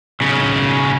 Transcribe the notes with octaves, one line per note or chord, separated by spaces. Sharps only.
B1 C#3